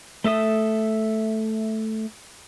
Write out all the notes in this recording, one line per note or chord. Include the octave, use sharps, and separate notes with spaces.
A3 A4 E5 D#6